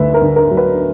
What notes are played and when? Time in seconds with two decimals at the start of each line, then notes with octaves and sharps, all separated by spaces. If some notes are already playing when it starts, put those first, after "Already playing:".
Already playing: D2 D3 B4 E5
0.14 A#4
0.22 D3
0.36 A#4
0.51 F#3
0.57 B4